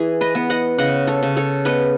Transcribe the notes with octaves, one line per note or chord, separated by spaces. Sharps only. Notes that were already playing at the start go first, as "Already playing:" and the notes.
Already playing: E3 G#4
B4 D#5
B3
D#5 F#5
C#3 D#5 F#5
A4 C#5
C#3
A4 C#5
B3 B4 D#5